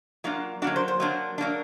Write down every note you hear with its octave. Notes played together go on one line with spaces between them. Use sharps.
F#3 A#3 D4 F4
F#3 A#3 D4 F#4
C5
C5
F#3 A#3 D4
F#3 A#3 D4